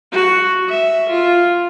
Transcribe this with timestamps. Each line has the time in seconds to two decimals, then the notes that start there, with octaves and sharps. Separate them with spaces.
0.13 F#4
0.69 E5
1.10 F4